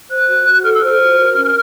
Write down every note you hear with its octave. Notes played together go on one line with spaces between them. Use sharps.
C5 F#6
F#4
F#4
A4 F6
E6
C5 F6
F#4
A#4
C#4